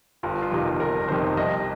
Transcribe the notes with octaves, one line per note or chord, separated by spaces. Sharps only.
G1 F4
F4
F2 C3 D#3
G1 A#4
F2 C3 D#3 C5
C2 D#5